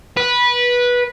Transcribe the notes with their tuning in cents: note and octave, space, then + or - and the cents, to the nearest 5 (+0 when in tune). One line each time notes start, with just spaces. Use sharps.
B4 -15